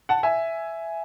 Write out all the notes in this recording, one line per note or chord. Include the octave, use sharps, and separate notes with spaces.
F#5 A5
E5 G#5